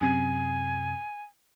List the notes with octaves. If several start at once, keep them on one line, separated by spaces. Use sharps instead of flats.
F#2 C3 G#5